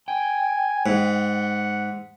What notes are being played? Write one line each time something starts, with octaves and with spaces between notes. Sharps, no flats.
G5 G#5
G#2 F#5